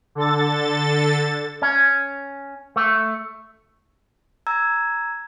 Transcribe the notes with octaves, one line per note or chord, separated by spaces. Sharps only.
D3 A4 A6
C#4
A3
A#5 E6 G#6